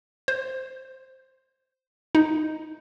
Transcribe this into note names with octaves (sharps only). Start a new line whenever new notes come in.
C5
D#4